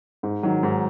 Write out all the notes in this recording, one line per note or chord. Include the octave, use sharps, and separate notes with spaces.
G#2
D#3 F#3
G#2